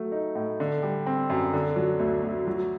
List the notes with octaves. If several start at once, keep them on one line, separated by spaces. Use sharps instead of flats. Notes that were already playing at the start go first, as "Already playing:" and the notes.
Already playing: F#3 A3
D#4
A2
D3
G3
C4
F#2
D3
F#3
D2
D2
F#3